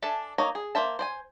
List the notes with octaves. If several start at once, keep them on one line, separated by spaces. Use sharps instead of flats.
D4 A4 E5 G#5 A5
A#3 D#4 C#5 A#5
G#4
A#3 C5 E5 A5
C5 D5 G#5